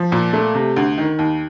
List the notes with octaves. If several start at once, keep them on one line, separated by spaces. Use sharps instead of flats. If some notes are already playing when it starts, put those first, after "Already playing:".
Already playing: F3
A#2
A3
C3
D2
D#3
D#2